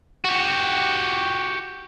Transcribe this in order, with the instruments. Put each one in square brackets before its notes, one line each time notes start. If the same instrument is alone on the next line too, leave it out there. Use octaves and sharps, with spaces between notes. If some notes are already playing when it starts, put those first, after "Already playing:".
[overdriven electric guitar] F#4 G4